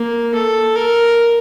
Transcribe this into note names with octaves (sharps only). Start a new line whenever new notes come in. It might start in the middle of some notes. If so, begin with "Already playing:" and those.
Already playing: A#3
A4
A#4